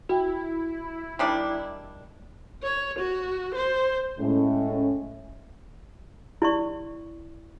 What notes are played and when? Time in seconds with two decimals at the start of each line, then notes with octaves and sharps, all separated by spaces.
0.09 E4 F#4 G5
1.19 D#3 G3 D4
2.63 C#5
2.99 F#4
3.54 C5
4.19 A2 G#3 C#4
6.42 E4 D5 C#6